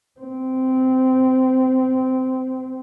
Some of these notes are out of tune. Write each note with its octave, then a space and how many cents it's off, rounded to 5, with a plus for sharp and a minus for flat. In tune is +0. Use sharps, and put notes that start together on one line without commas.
C4 -15